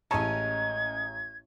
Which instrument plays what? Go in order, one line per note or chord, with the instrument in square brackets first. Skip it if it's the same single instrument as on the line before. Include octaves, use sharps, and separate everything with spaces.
[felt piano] A1 A#5 [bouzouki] G#3 C#4 D#4 [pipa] A4 C#5 [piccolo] G#6